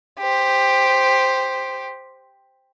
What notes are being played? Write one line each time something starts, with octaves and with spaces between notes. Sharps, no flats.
G4 C5